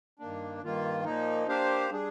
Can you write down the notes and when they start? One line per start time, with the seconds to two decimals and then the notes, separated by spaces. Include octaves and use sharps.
0.19 G2 D#3 A#3 D4
0.63 G2 D#3 A#3 F4
1.04 A#2 F3 A#3 D#4
1.48 A#3 D4 G4 C5 F5
1.91 G3 D4 G#4